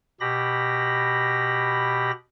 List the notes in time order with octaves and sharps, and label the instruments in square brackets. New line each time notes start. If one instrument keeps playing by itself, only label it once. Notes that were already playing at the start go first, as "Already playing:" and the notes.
[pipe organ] B2 G4 B5 A#6